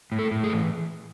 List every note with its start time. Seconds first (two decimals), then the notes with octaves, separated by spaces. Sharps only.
0.12 A2
0.19 A4
0.31 A2
0.44 G#4
0.49 E3